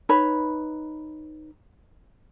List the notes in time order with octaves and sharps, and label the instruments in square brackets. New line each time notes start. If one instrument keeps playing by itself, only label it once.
[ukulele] D#4 B4 C#5 B5